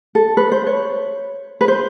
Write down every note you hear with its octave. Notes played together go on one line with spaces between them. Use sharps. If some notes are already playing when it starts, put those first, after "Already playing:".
A4
B4
C5
C#5
B4
C5